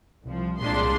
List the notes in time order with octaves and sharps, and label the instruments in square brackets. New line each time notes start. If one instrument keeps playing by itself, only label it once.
[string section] C2 F3
[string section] C2 A#2 C6 [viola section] G#3 D4